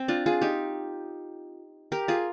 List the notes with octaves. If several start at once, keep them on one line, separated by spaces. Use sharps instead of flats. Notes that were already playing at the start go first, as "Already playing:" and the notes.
Already playing: C4
D4 F4
F4 G#4
D#4 G4
G4 A#4
F4 G#4